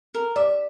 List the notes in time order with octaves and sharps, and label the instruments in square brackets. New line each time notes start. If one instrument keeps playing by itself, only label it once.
[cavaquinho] A#4
[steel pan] D5 [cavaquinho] E5